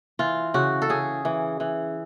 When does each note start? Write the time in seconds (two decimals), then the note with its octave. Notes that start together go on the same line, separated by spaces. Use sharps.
0.19 E3 F4
0.54 C#3 F#4
0.82 A4
0.89 C#3 G#4
1.25 E3
1.60 E3